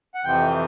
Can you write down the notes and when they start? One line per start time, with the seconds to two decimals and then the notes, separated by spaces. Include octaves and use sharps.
0.14 F#5
0.24 F2 C3 E3 G5